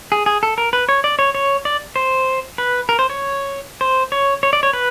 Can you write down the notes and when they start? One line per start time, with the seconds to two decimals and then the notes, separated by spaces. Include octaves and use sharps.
0.12 G#4
0.26 G#4
0.43 A4
0.58 A#4
0.73 B4
0.89 C#5
1.04 D5
1.19 C#5
1.35 C#5
1.65 D5
1.96 C5
2.58 B4
2.89 A#4
2.99 C5
3.10 C#5
3.81 C5
4.12 C#5
4.43 C#5
4.53 D5
4.63 C#5
4.73 B4